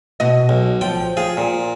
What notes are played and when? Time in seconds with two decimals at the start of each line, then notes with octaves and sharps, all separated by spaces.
0.20 B2 F#4 D#5
0.49 B1
0.81 F3 G5
1.17 F4 G#4
1.37 A#2